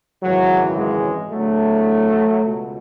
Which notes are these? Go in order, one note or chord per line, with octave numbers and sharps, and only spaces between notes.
G#1 F#2 C#3 E3 F#3
G#3
E2 D3 F#3 A3
C#2 B2